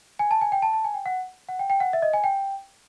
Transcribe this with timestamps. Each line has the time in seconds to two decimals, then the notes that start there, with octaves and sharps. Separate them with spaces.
0.19 G#5
0.31 A5
0.41 G#5
0.52 G5
0.62 A5
0.73 A5
0.84 G#5
0.94 G5
1.06 F#5
1.49 F#5
1.59 G5
1.70 G5
1.80 F#5
1.93 E5
2.02 D#5
2.13 G#5
2.24 G5